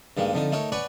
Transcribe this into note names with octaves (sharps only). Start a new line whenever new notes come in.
G2 D#3 G#3 A#3
F2 D3 D#4 D#6
A3 D#4 A#4 C#5
B4 C#5 D5 F#5 G#5